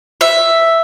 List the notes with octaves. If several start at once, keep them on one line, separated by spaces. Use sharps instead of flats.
E5